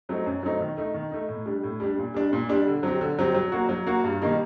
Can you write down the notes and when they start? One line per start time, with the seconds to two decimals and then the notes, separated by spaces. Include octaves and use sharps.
0.09 F#3 A3 C4 D#4
0.26 F#2
0.43 F#3 A3 C4 D#4
0.60 D#3
0.77 A3 D#4
0.94 D#3
1.11 A3 D#4
1.29 A2
1.46 G3 D4
1.64 A2
1.80 G3 D4
1.98 A#2
2.14 G3 D4
2.33 A#2
2.49 G3 D4
2.67 D3
2.83 F#3 C4 G4
3.01 D3
3.19 F#3 C4 G4
3.35 F#3
3.52 A#3 F#4
3.69 F#3
3.86 A#3 F#4
4.04 G2
4.22 D#3 G3 A#3 D#4